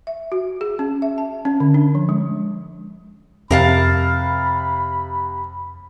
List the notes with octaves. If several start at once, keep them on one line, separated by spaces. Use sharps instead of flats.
E5
F#4
G#4
C#4
E5
A5
C#4
D3
D4
F3
G#3
F2 C3 A#4 F5 A5 B5